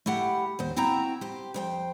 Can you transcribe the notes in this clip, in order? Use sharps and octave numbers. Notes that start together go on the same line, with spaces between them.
A3 E4 G4 F#5
D#2 C5
C4 E4 F#4 G5 A#5
G4 C5
F2 C5 G5